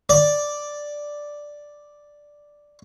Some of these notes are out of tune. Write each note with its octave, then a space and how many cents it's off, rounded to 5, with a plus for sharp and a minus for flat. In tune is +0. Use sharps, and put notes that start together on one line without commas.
D5 +0